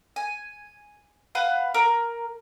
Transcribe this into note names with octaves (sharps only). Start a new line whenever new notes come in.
G#5
B4 F5 F#5
A#4